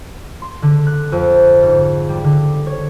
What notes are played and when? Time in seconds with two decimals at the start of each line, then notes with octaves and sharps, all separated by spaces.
0.42 C6
0.62 D3
0.87 F#6
1.12 F2
1.63 G#2
2.09 G3
2.24 D3
2.66 C#5